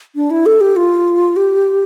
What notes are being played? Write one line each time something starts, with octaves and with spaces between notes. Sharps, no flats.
D4
E4
A4
G4
F4
G4